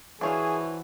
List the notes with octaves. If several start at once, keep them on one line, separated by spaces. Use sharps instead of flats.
E3 D4 E4 F#4 G#4 C5 C#5 F5